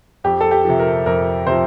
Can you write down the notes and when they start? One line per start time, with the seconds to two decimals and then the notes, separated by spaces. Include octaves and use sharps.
0.24 F2 G4
0.41 A4
0.51 G4
0.65 C3 F3
0.79 A#4
1.06 F2 A#4
1.46 C3 F3 C5